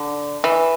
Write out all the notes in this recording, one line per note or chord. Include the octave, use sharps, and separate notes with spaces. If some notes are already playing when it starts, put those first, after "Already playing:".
Already playing: D3
E3